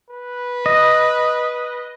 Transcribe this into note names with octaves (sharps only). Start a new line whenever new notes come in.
B4
D#5